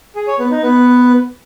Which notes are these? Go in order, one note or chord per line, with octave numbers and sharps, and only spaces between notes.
G#4
C#5
B3
D#4
B3